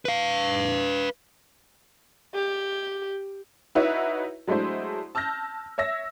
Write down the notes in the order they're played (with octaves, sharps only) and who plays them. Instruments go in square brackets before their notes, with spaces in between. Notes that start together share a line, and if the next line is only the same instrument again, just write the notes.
[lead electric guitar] B4 F5
[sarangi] G4
[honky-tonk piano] D#4 E4 F#4 B4 C#5 E5
F#3 G#3 A3 D4 E4 C5
A5 E6 F6 G6 A#6
C#5 E5 E6 A#6